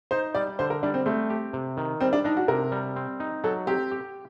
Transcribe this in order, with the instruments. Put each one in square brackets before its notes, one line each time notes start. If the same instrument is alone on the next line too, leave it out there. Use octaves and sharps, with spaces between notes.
[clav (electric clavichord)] D#4 [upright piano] C5
[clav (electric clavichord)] G3 [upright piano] D5
[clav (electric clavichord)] D3 [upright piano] C5
[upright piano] A#4
[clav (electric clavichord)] G3 [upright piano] D4
[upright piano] C4
[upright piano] A3 [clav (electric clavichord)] C4
[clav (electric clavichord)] G4
C3
D#3
[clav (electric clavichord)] G3 [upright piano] C4
[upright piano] D4
[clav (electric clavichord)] D4 [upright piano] D#4
[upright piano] F#4
[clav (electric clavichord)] C3 [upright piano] A#4
[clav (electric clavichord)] G3
C4
D#4
[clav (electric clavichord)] F#3 [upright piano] A4
[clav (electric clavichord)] C4 [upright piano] G4
[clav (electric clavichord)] G4